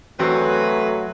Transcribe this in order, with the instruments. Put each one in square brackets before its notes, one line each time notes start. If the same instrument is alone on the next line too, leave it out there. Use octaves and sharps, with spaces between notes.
[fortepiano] E2 C4 F#4 [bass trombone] F#3 [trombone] A3 [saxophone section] G#4 B4